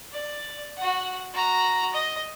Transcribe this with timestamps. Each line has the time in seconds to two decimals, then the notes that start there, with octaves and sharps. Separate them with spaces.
0.12 D5
0.77 F#4 F#5
1.33 F#4 A#5
1.93 D#5